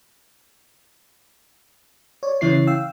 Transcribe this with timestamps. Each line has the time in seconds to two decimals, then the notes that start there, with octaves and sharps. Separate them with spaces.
2.23 C#5 D5
2.41 C#3 E3 C#4 E4 C#5 C7
2.67 F5 G5 E6